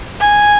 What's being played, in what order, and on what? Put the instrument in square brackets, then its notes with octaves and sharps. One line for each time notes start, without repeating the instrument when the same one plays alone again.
[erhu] G#5